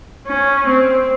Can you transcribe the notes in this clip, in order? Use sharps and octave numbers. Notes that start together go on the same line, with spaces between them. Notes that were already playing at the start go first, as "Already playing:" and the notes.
C#4
C4